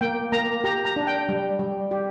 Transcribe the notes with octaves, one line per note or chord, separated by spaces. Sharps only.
A#3 G5
A#3 A#5
G4 A#5
A#5
D4
G5
G3
G3
G4